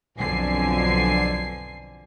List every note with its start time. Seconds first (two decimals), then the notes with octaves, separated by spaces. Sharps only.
0.18 B1 F2 D3 G#5 C7